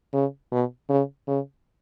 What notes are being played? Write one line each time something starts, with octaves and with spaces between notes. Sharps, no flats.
C#3
B2
C#3
C#3